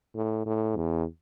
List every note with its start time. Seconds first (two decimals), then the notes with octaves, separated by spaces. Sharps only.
0.15 A2
0.45 A2
0.76 E2